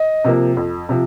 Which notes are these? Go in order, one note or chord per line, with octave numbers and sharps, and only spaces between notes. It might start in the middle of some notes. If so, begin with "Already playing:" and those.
Already playing: D#5
C3 F3 A#3
F2
C3 F3